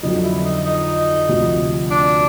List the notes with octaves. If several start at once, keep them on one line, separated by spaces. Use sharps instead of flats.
F2 D3 F#3 D#4
E4
D#4
D#4
D2 C3 F3
D4